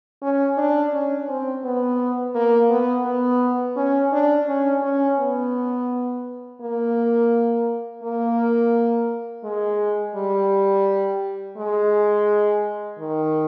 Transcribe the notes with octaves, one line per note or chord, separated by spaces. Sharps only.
C#4
D4
C#4
C4
B3
A#3
B3
B3
C#4
D4
C#4
C#4
B3
A#3
A#3
G#3
G3
G#3
D#3